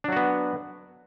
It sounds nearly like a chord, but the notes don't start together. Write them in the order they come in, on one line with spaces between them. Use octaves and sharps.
D4 F#3 F#4 B3